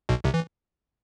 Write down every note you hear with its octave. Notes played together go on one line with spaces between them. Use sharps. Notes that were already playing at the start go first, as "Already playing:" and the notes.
B1 B2
C2 C3
E3